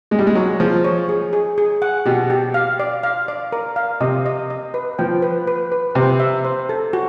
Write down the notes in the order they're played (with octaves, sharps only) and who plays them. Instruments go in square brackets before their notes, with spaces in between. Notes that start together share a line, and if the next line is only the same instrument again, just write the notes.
[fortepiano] G#3 [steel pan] G#4
[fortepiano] G3
G#3
[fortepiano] F#3 [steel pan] C#5
[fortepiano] F3 [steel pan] G#4
[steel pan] C#5
G#4
G#4
G#4
F#5
[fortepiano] B2 [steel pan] G4
[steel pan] G4
F5
D5
F5
D5
A#4
F5
[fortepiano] C3 [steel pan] D#5
[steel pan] D#5
D#5
B4
[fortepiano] F3 [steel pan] G5
[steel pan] B4
B4
B4
[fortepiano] C3 [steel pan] C5
[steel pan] E5
C5
A4
F#4